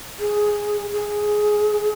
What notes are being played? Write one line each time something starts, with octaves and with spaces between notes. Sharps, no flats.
G#4
G#4